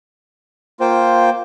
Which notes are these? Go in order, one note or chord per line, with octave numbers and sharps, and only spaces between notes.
A#3 F4 C5 G5